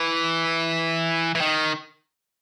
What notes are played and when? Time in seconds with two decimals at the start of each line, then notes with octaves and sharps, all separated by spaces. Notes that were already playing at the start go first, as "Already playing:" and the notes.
Already playing: E3
1.35 E3
1.41 D#3